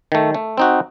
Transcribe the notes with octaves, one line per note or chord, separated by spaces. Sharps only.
D#3 A3
A3
C4 D#4 F#4